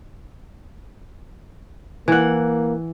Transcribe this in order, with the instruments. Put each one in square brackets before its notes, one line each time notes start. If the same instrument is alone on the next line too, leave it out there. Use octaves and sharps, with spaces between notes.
[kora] E3 F#5 [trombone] A#3